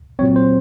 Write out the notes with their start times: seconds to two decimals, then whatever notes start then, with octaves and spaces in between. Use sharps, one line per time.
0.19 A#2 F#3 C4 C#5
0.36 C5